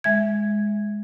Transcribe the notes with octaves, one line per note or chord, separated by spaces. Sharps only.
G#3 E5 G#6